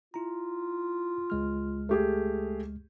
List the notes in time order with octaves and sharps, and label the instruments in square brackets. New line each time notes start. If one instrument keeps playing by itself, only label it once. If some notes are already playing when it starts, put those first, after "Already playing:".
[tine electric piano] E4 A#5 [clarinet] F4
[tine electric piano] C#2 G#3 F6
[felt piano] A3 G4 G#4